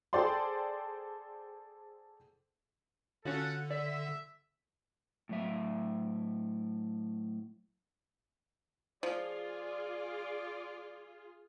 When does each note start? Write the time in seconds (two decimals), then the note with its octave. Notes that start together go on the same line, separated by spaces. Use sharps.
0.13 G#4 A4 C5 D5 G5 C6
3.25 D3 C#4 F4 F#4 A4 F#5
3.70 D5 E5
5.29 A2 F#3 E5
9.03 F3 F4 G#4 D5